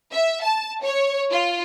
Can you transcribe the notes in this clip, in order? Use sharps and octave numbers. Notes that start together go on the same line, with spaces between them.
E5
A5
C#5
F4